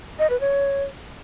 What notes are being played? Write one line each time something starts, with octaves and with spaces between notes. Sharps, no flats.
D#5
B4
C#5